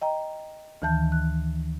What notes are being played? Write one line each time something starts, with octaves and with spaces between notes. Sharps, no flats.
D#5 G5 A#5
D2 D#3 E3 A5 G6
F#6